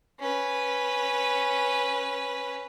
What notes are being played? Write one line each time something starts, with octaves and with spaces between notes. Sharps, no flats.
C#4 B4